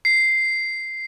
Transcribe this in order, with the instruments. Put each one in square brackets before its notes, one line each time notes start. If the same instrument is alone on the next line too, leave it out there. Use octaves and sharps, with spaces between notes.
[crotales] C7